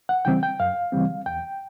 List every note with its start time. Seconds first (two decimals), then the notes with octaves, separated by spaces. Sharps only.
0.09 F#5
0.25 C#3 E3 G3 C4 G5
0.43 G5
0.60 F#2 F5
0.92 C#3 E3 G3 C4
1.26 E2 G5